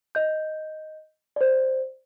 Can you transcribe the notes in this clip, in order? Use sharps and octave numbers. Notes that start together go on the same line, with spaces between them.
D#5 G6
C5 D5